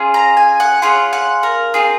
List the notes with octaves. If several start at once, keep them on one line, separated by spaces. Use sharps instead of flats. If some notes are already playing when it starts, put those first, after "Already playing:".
Already playing: C#4 F4 G#4
A#5
G#5
F#5
C#4 F4 G#4 F#5
F#5
A#4
C4 F4 G#4